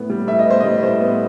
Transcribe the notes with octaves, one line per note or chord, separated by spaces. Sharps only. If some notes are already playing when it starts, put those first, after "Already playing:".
Already playing: A2 B3
G3
A2 E5
D#5
B3 C5
G3 D#5
A2 C5
B3